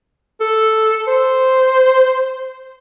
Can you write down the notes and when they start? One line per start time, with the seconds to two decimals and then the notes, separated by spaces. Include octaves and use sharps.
0.41 A4
1.08 C5